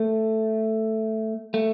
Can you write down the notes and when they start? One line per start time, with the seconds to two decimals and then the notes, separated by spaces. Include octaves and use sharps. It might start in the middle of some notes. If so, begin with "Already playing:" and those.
Already playing: A3
1.54 A3